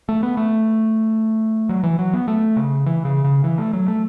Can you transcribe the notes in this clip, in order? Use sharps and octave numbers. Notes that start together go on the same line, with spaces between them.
A3
B3
A3
F#3
E3
F#3
B3
A3
C#3
E3
C#3
C#3
E3
A3
F#3
A3